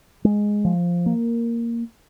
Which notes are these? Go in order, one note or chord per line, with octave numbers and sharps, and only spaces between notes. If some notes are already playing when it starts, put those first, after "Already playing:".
G#3
F3
A#3